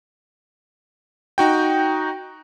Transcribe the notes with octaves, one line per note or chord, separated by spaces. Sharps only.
D#4 F#4 G5